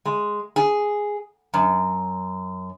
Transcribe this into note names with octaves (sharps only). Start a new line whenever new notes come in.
G#3
G#4
F#2